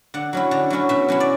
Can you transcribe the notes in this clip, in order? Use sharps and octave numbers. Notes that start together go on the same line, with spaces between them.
D3 F#5
F#3 C#4 E4
D3
F#3 C#4 E4
B2 E5
F#3 C#4 E4
D5